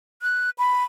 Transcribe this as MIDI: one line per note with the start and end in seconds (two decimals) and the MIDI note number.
0.22 0.50 90
0.58 0.84 83